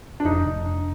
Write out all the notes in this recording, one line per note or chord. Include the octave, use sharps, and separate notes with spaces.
D4
F1 D#4
F1
D4